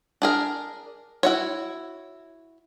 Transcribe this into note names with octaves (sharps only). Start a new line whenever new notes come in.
D4 G#4 A#4
E4 F#4 C#5